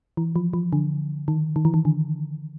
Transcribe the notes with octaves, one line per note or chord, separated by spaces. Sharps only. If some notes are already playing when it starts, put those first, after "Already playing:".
E3
F3
F3
D3
D#3
D#3
E3
D#3
D3